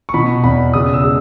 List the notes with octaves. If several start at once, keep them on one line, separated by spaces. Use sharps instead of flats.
C#6
B2 B5
E2 B5
C#3 D#6
E6
G#3